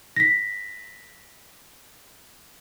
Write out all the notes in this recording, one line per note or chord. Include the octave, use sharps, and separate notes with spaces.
A#6 B6